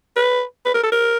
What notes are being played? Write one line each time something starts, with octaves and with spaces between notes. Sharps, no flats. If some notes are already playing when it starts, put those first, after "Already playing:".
B4
B4
A#4
A4
A#4